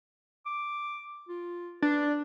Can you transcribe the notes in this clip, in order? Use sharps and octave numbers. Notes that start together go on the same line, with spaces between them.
D6
F4
D4 B4